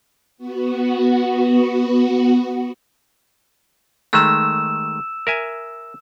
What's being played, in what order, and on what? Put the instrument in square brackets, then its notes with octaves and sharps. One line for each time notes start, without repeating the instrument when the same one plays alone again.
[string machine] B3 F#4
[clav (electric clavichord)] D#3 G#3 A3 [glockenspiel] E6 E7
[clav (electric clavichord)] A#4 E5 G#5